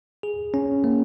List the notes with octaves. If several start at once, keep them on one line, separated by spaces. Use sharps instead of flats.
G#4
C#4
A#3